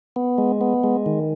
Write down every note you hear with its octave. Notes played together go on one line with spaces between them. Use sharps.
B3
G#3
B3
G#3
D#3